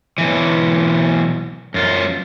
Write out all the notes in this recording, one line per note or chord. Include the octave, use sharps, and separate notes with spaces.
B1 E3
F#2 F4